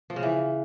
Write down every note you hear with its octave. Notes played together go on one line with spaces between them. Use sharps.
F3
C#3
E3